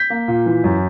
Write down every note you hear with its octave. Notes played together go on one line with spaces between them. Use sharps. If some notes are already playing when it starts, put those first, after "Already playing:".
Already playing: G6 B6
A#3
A#2
E3
F#2